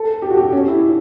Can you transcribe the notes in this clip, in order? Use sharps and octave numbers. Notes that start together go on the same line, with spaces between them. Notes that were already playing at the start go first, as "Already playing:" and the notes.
Already playing: A4
G4
F#4
G4
C#4
E4